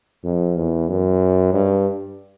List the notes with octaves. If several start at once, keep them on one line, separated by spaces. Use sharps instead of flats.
F2
E2
F#2
G2